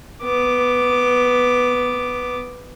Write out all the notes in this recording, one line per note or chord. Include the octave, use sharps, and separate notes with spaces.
B3 D6